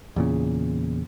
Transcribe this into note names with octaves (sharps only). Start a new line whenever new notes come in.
E2 A#2 C#3